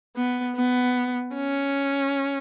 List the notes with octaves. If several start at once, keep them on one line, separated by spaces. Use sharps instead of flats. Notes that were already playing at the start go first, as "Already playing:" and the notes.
B3
B3
C#4